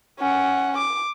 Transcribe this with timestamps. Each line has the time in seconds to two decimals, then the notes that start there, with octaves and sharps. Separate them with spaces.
0.19 C#4 F#5
0.78 D6